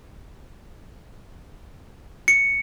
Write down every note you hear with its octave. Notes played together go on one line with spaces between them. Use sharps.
C#7